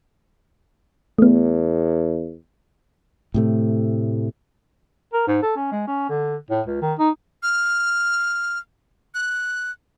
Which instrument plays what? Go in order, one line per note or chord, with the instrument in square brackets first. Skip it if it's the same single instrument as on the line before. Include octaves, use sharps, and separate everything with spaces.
[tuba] E2 [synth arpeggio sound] A3 B3
[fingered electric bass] A2 C3 A3
[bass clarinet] A#4
G#2
A4
C#4
G#3
C#4
D3
A2
C#2
D#3
D#4
[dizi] F6
F#6